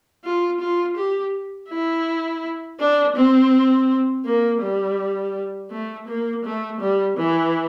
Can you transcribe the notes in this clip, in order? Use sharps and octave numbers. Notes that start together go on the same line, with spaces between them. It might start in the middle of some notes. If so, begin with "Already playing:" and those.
F4
F4
G4
E4
D4
C4
A#3
G3
A3
A#3
A3
G3
E3